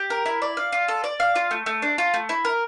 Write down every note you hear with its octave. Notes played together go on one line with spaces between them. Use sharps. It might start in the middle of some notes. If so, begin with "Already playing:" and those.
Already playing: G4
A#4
E4
D5
F5
F4
A4
D5
F5
F4
A3
A3
D4
F4
A3
E4
A#4